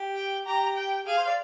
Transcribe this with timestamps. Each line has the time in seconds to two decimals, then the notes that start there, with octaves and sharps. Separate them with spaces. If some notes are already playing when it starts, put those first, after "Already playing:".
Already playing: G4
0.15 G5
0.46 G4 A#5
0.77 G5
1.06 G#4 F5
1.17 C5
1.27 D5